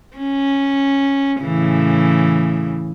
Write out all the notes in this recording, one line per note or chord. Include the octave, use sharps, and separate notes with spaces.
C#4
A2 C#3 E3